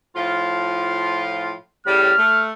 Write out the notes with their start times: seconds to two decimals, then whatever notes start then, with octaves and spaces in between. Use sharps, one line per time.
0.16 A2 F3 F4
1.87 A2 C#3 G3 F6
2.18 A3